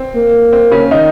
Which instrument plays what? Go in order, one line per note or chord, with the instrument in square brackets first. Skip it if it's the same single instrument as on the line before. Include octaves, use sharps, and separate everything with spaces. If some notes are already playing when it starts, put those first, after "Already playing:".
Already playing: [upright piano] C4
[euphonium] A#3
[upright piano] C4
C#3 C#4
D#3 D#4